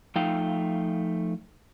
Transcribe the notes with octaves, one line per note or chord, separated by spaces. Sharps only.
F3 A3 D#4 F5 G5